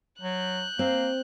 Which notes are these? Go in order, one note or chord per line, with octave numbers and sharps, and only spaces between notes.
F#3 F#6 G6
A#3 C4